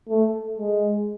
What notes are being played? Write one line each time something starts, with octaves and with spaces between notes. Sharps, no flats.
A3
G#3